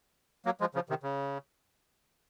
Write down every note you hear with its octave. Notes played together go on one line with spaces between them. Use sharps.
F#3 A#3
F3 G#3
C#3 F3
C3 D#3
C#3